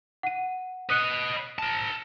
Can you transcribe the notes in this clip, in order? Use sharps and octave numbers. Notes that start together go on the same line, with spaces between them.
F#5 D#7
B4 D#5 D#6 F#6 C#7
A#4 A5